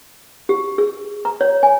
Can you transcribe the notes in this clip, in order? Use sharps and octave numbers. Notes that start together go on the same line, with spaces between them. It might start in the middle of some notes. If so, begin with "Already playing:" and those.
G4
G#4
A#5
C#5
G#5